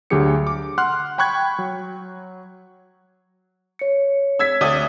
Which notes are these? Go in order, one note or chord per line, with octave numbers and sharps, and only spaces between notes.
D2 D3 F#3 G4 G#4 C#7
D6
F#5 C6 F6 F#6
G5 B5 C#6 F#6 G#6
F#3
C#5 C#7
E6 G#6 B6
D2 D5 D#6